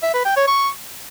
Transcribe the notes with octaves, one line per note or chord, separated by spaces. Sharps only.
E5
B4
G5
C#5
C#6